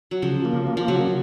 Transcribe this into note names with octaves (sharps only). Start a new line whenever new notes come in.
F#3
C#3 F3
A#3
A#3
F3
C#3 F#3